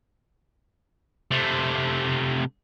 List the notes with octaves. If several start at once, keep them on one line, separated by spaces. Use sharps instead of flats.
C3 A3